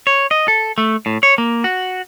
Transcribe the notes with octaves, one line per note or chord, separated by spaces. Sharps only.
C#5
D#5
A4
A3
A2
C#5
A#3
F#4